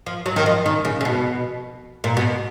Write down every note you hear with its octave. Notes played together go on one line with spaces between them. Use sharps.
F3
F#3
D#3
F3
D#3
C#3
C#3
B2
A#2
B2